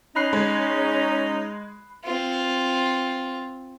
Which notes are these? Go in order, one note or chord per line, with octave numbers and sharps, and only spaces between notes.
C#4 D#4 B5 F#6 C7
G#3
C4 F4